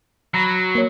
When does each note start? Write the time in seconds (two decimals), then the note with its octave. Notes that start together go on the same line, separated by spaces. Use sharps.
0.34 F#3 A#5 B5 A#6
0.75 A#3 C#5